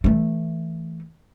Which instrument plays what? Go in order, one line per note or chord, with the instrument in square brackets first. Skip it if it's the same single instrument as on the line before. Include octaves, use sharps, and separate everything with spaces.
[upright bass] E3 A3